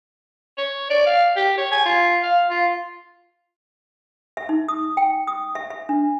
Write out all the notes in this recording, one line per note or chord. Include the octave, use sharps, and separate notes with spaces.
C#5
D5
F5
G4
C#5
G#5
F4
F5
F4
E5
D#4
D#6
G5
D#6
E5
E5
D4